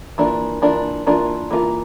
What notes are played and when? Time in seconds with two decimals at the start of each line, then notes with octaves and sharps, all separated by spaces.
0.18 E3 A#3 D4 F4 A#4
0.62 E3 A#3 D4 F4 A#4
1.07 E3 A#3 D4 F4 A#4
1.51 E3 A#3 D4 F4 A#4